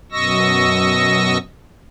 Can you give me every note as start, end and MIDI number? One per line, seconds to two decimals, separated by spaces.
0.12 1.38 42
0.12 1.38 47
0.12 1.38 75
0.12 1.38 85
0.12 1.38 88
0.12 1.38 94